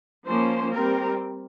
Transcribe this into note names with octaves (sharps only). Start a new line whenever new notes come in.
F3 A#3 C#4 C5
G3 C4 A#4